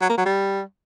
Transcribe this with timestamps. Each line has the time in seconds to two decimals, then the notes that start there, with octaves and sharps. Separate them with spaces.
0.01 F#3
0.09 A#3
0.18 F#3
0.26 G3